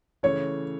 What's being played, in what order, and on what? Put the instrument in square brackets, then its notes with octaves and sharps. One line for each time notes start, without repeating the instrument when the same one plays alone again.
[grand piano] C#3 E3 A3 [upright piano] C#5